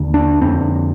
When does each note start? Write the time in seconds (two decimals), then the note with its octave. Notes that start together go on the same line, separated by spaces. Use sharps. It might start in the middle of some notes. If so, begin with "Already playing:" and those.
Already playing: D#2 D3
0.14 D4
0.41 F2 D3 C4